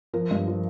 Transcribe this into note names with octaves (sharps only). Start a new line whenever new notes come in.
F3 A#4
G2
F3